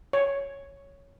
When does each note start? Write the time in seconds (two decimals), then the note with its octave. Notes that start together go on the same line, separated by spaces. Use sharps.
0.13 C#5